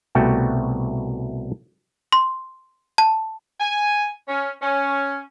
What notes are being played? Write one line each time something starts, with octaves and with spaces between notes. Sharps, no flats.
C2 B2 A3 F#4 G4 G5
C6
A5
G#5
C#4
C#4